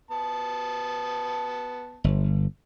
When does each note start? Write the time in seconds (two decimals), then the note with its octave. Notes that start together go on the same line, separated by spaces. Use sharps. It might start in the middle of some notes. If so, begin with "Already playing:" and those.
0.11 B3 A5
2.04 G1